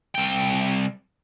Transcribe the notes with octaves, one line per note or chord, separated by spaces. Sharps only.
C2 G5